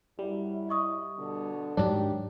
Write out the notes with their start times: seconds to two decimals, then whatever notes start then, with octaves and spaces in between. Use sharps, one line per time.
0.19 F#2 G3 E4
0.69 D#5 C#6 D#6
1.18 B2 D3
1.77 G#2 D#3 F#3 D4 G4 C#5